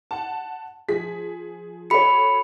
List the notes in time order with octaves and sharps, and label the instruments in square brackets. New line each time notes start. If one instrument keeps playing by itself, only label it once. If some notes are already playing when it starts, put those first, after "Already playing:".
[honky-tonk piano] F#5 A5
F3 G#4 B6
[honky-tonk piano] F#4 A4 C#5 [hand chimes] B5 C#7